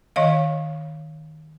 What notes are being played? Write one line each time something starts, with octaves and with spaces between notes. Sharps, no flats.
D#3 C#5 D#5 F5